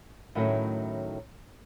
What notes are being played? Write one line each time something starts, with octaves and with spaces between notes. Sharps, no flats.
A2 D#3 F#3 A3 C#4 E4